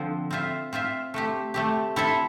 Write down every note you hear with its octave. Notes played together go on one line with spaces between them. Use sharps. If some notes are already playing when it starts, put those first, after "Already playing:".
Already playing: D3 F3 C4
C4 F4 C5 E5
C4 F4 C5 E5
A3 C4 G4
A3 C4 G4
C4 E4 A4 E5